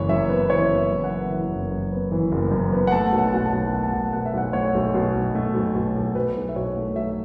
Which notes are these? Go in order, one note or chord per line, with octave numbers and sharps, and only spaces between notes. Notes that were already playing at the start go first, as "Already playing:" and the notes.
Already playing: F#1 E3 C#5
F#2 E5
B3
E3 C#5
F#1
E5
F#2
F#5
B3
E3
F#1
F#2
B3
E3
F#1
F#2
B3
F#5
A3 A5
B1
F#5
A5
B2 F#5
A5
B1
A3 F#5
A5
B1 F#5
B2 F#5
E5
B1 F#5
A3 C#5
B1
B2
B1
A3
B1
B2
B1
F#3 B4
B1
E5
B2 C#5
A3
F#3 E5